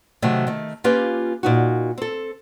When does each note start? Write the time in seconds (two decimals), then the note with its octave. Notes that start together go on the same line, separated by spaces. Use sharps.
0.22 C3 D#3 F#3 A3
0.47 D#3 A3
0.84 A#3 C#4 F4 G4 B4
1.43 A#2 D#4 F#4
1.98 C4 A4